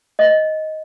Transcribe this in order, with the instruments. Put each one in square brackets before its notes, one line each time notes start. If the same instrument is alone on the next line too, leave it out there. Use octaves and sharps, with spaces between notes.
[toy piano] D#5